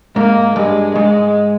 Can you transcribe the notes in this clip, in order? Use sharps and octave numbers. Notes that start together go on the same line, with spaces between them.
G#2 A#3
G2 G#3
G#2 G#3